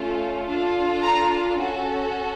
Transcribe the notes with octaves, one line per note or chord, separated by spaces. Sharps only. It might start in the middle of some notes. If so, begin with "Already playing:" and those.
Already playing: A3 C#4 F4 A4
D4 F4 A4
A#5
C#4 F#4 A4